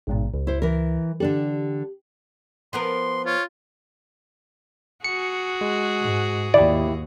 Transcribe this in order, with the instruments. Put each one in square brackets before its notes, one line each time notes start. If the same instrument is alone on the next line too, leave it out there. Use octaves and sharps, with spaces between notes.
[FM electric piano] A1 G#2 B2
C#2
[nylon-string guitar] E4 C5
E3 A#4
[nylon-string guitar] D3 D4 A4 [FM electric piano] G4
[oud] F3 B3 A#4 [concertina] C6
[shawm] F4 [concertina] C#5
[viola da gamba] F#4 G#4 [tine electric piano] C#7
[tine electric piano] G#3
[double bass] G#2
[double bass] D#2 [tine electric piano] E4 G4 [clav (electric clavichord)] D5